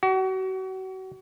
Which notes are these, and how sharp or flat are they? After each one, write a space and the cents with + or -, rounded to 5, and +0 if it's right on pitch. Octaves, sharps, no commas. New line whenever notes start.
F#4 +35